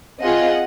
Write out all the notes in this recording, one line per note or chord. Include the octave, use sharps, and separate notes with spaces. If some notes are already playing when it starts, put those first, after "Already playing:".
C4 F4 G#4 D#5 F#5